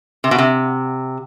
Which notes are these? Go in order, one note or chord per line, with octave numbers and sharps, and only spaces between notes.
C3
B2
C3